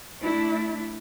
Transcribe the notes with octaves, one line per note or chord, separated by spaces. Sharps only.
A3 D4 E4